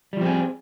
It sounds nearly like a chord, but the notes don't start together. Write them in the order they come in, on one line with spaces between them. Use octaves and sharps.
G3 F3 C4 G#4